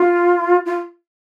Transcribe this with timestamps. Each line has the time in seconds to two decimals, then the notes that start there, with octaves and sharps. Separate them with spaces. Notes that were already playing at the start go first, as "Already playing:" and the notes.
Already playing: F4
0.66 F4